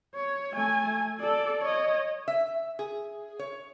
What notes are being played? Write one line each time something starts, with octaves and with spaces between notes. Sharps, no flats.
C#5
A3 G#5
A4 D5
C#5 D#5
E5
G#4
C#5